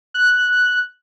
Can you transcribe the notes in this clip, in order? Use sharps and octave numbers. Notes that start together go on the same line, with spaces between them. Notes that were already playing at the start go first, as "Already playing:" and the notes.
F#6